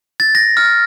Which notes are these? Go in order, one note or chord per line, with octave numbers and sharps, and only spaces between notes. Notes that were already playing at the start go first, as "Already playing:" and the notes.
A6
A#6
F6